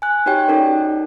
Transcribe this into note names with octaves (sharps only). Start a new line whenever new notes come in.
G#5 F#6
D#4 F#4 G4 C#5 G5
C#4 D#4 A4 A#4 D5